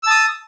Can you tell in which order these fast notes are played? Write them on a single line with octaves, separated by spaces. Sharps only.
E6 A5 D#6